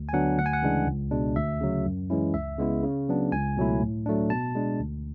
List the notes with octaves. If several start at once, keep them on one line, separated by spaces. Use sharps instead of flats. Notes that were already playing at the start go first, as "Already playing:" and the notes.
Already playing: D2
G#5
D3 F#3 B3 D4 F#5
D2 F#5
G#5
F#5
C#3 E3 G#3 D4
C#2
B2 G#3 D4
D2 E5
C#3 F#3
F#2
E3 G#3 C#4 E4
C#2 E5
C#3 G#3 B3 E4
C#3
F#3 B3 D4
C#2 G#5
B2 F#3 A3 E4
A2
F#3 A3 D4
B2 A5
G#3 D4
D2